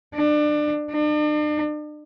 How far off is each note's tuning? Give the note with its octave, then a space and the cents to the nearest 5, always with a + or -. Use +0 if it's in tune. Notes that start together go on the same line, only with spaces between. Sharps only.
D4 +25
D4 +40